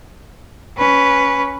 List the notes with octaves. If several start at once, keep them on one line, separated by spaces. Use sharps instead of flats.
C#4 B4